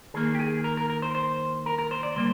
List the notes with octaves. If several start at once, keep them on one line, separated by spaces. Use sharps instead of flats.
D#3 A#3 G#4
G4
G#4
A#4
A#4
A#4
C5
C5
A#4
A#4
C5
D5
D3 G3 A#3 C5